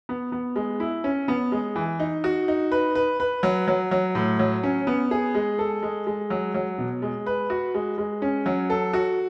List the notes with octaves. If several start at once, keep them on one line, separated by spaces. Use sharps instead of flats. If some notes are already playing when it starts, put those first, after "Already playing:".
B3
B3
G#3
E4
C#4
B3
G#3
E3
D#4
F#4
D#4
B4
B4
B4
F#3
F#3
F#3
A2
F#3
C#4
B3
G#4
G#3
A4
G#3
G#3
F#3
F#3
B2
G#3
B4
F#4
G#3
G#3
C#4
F#3
A4
F#4